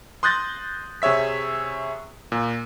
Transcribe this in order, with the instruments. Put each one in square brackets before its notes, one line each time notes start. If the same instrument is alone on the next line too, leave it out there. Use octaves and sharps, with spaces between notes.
[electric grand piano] C6 D#6 F#6 G6 A6 A#6
C3 G#4 C#5 E5 B6
A#2